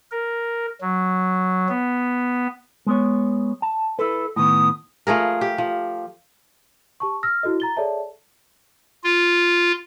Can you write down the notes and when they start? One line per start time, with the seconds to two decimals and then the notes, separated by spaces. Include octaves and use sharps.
0.11 A#4
0.81 F#3
1.69 B3
2.86 G#3 B3 C#5
3.62 A5
3.99 E4 A4 B4
4.36 A2 D#3 B3 D#6
5.07 F3 A3 G#4 A#4
5.41 G4
5.58 F3
7.00 G4 A5 C#6
7.23 E6 F6 A#6
7.43 E4 F#4 A4 D#5
7.60 A#5 A6 G7
7.77 G#4 A4 C#5 D5 E5 A5
9.04 F4